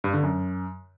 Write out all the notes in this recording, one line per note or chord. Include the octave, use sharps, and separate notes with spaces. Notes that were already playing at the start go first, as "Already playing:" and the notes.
G2
D3
F#2